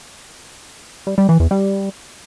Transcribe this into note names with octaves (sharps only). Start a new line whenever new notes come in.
G3
G3
E3
E2
G3